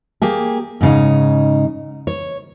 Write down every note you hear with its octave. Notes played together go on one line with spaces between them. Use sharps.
A#3 G4 G#4
G#2 C#3 D#4
C#5